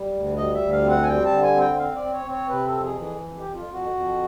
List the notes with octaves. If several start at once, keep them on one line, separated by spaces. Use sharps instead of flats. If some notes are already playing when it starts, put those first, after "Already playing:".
Already playing: G3
D2
G3 D#5
E5
D2
F5
C4
F#5
G#5
G3 G5
A5
D3
G#5
C4
G5
C4 F5
D5
C4
C#5
C4
C#5
C3 B4
A4
F2
G#4
E3
G#4
F2
G4
F2
F4
F2
F#4
F2